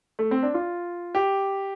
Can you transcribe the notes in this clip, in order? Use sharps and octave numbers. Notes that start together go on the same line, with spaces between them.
A3
C4
D4
F4
G4